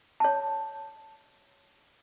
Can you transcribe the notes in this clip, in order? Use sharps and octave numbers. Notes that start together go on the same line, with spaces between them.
C#5 A5